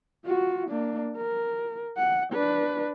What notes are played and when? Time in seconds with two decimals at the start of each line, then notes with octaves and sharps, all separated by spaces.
0.25 F4 F#4
0.69 A#3 D4
1.16 A#4
1.97 F#5
2.32 D4 B4